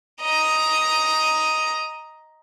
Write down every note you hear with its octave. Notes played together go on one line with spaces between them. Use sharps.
D#5 A#5